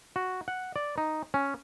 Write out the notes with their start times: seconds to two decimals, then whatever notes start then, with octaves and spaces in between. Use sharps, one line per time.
0.16 F#4
0.48 F#5
0.76 D5
0.98 D#4
1.34 C#4